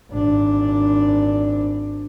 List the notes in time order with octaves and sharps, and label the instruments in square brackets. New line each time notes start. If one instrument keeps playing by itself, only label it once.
[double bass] G#1 D4